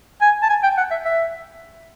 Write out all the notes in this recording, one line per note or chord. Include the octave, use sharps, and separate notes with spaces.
G#5
A5
G#5
G5
F#5
E5
E5